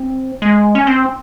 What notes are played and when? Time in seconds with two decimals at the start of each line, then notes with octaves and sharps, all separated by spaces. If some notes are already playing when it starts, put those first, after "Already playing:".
Already playing: C4
0.42 G#3
0.75 C#4
0.87 C4